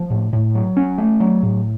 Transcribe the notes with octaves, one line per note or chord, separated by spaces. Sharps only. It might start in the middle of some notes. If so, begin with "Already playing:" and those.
Already playing: F3
A2
A2
F#3
C#4
A3
F#3
A2